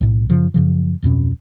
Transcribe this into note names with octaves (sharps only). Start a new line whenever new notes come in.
B1 A2
F#2 C#3 F3
F#2 C#3 F3
D1 F2 B2 C#4